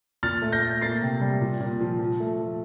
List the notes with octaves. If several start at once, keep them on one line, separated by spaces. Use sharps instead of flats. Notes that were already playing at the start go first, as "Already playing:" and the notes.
A#2 F6 A6
A3
G6 A#6
A3
A#3 A6 C7
C3
G3
A#2
A#2
F3
F3
A3
F3